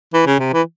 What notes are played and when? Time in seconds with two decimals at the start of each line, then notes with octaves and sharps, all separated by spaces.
0.14 E3
0.27 C#3
0.40 C3
0.53 E3